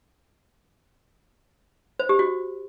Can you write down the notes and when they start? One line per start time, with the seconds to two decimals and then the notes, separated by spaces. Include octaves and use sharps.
1.99 C5
2.09 G4
2.19 F#4